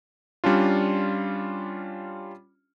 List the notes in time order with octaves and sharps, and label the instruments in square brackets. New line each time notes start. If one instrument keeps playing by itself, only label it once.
[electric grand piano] G3 C#4 D4 F4